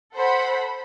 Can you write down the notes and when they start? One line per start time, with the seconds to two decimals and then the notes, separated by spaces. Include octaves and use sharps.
0.13 A4 C5 F#5 B5